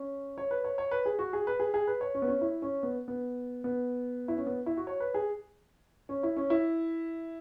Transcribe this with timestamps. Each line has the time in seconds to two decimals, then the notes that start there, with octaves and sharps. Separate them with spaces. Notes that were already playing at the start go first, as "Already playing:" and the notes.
Already playing: C#4
0.38 C#5
0.51 B4
0.64 C#5
0.78 C#5
0.91 B4
1.06 G#4
1.19 F#4
1.33 G#4
1.47 B4
1.60 G#4
1.74 G#4
1.87 B4
2.01 C#5
2.15 C#4
2.22 B3
2.28 C#4
2.41 E4
2.62 C#4
2.83 B3
3.08 B3
3.64 B3
4.28 E4
4.37 C#4
4.47 B3
4.66 E4
4.77 F#4
4.87 C#5
5.00 B4
5.14 G#4
6.09 C#4
6.23 E4
6.37 C#4
6.50 E4